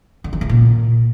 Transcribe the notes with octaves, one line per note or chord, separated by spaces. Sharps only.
D3
E3
C#3
A#2